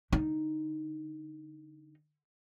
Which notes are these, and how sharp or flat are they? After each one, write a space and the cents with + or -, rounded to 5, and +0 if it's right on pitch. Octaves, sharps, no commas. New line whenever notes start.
D3 -20 D#4 +0